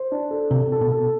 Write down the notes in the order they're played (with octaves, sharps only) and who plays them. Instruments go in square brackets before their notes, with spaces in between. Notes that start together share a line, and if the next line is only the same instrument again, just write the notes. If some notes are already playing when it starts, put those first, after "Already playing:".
Already playing: [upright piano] C5
D4
A4
[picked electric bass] C3 [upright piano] A4
[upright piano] A4
[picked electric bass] B2
[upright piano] A4